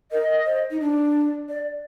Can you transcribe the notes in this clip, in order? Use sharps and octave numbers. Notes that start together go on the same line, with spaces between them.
A#4 D#5
C5
D#4
D4
D5